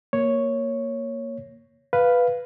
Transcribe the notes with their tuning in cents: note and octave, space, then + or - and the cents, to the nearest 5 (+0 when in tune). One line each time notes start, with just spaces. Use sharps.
A#3 +0 C#5 +0
B4 +0 F5 +0